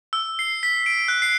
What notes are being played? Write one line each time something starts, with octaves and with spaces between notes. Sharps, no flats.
E6
C7
B6
D7
F#6
C7